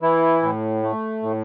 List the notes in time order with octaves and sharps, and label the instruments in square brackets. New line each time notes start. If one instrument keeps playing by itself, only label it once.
[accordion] E3 E4
A2
A3
A2